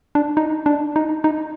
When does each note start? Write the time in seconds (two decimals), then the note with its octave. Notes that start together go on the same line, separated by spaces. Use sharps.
0.15 D4
0.37 D#4
0.66 D4
0.96 D#4
1.24 D#4